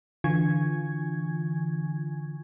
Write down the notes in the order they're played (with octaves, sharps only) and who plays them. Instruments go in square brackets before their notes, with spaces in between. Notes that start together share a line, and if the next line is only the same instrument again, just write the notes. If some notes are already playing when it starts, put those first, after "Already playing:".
[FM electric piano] D3 E3 F4 G#5 C#6 G#6